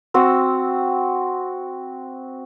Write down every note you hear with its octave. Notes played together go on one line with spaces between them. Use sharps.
C4 F#4 E6